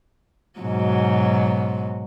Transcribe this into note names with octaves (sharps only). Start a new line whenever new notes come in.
G#2 B2 F#3